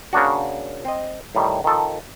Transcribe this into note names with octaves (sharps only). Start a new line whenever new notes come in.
C#3 A#3 D4 F#4
C4 D#5
A2 D#3 G3
D#3 F3 A4